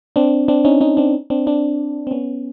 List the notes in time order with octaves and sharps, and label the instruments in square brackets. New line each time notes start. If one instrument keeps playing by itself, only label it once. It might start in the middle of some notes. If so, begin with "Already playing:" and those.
[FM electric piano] C4 D4
C4 D4
C#4 D#4
C#4 D#4
C4 D4
C4 D4
C4 D4
C4
B3 C#4